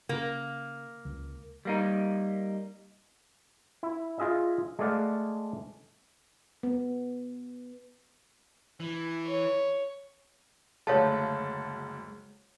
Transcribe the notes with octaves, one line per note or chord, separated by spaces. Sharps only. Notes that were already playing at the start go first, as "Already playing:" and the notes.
C#3 A#3
C#2
G3 A#3 D#4
E4
F4 G#4 D#5 E5
G#3 A3 G#4 D5 F5 F#5
B3
E3
C#5
F#1 D2 G#3 A4 C#5 F5 A5